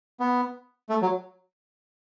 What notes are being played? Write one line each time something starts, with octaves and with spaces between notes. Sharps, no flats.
B3
A3
F#3